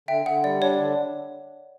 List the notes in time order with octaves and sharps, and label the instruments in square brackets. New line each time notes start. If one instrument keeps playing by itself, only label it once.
[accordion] D3 [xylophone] E5 G5
[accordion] D3 [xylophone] F#5
[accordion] G3 [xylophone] D5
[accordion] D4 [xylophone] C#5
[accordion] D3